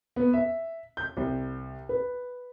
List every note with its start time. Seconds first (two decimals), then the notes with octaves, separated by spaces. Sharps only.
0.16 B3
0.33 E5
0.97 G6
1.17 C2
1.89 B4